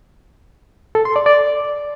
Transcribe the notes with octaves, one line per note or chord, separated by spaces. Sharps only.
A4
C6
D5
D5